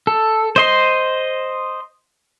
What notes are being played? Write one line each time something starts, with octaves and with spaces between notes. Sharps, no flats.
A4
C5 D#5 C6